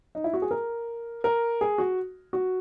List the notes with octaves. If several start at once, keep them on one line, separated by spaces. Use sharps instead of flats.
D#4
E4
F#4
G#4
A#4
A#4
G#4
F#4
F#4